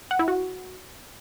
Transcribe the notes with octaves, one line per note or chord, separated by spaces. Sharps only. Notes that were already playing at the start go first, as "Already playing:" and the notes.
F#5
E4
F#4